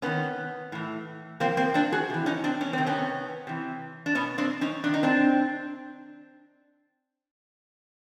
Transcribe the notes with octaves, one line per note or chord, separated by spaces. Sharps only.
C3 D#3 B3 C#4
A2 E3
C3 F3 A#3 C4
A#3 C4
C4 D4
F#4 G#4
C3 E3
C#4 D#4
C4 D4
C#4
C3 D#3 C4
B3 C#4
C3 E3
D4
B2 B3 C#4
C4 D4
C#4 D#4
C3 D#3 D4
D#4
C4 D4